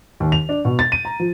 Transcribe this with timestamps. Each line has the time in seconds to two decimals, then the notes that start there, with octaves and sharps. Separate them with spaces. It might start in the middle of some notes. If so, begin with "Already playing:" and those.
0.20 D#2
0.32 F7
0.49 D4
0.65 B2
0.79 A6
0.92 D#7
1.05 A#5
1.20 F3